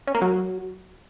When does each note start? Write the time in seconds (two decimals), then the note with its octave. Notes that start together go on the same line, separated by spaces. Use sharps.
0.07 C#4
0.15 A#3
0.22 F#3